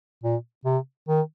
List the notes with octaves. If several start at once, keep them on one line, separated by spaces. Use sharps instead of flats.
A#2
C3
D#3